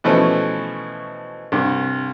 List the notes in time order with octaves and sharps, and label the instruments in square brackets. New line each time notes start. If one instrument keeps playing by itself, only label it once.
[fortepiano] B2 E3 F3 A3 C#4
C2 G2